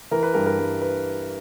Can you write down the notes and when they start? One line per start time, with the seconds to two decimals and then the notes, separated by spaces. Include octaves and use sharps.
0.11 E3 A#4
0.23 B4
0.34 G2 A#4
0.46 A#4
0.59 G2
0.82 B4